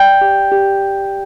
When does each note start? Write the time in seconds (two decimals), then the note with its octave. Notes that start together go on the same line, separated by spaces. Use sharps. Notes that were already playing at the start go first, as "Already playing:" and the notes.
Already playing: D5 G5 G6
0.21 G4
0.52 G4